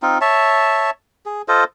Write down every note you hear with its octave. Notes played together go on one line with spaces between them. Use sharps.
C4 D#4 F4
C#5 E5 A5
G#4
F4 A4 C5 D#5